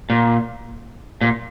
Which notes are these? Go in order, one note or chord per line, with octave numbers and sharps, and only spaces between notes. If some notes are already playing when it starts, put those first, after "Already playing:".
A#2
A#2